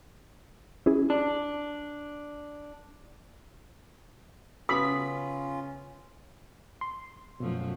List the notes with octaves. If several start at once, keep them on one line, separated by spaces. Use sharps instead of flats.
C#4 E4 G#4
D4
C#3 B3 C#4 F4 B5 D#6
C6
F#2 B2 F3 A3